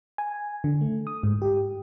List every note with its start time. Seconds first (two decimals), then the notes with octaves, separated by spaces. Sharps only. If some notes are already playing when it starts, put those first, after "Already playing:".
0.18 G#5
0.64 D3
0.81 A3
1.07 D#6
1.23 G#2
1.42 G4